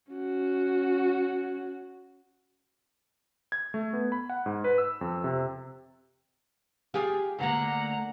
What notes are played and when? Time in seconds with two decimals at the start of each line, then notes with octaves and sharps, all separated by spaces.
0.12 C#4 F#4
3.52 G#6
3.74 A3
3.93 B3
4.12 B5
4.30 F#5
4.46 G#2
4.64 B4
4.78 E6
5.01 F2
5.24 C3
6.94 F4 G4 G#4
7.39 D2 D3 A#3 F#5 A#5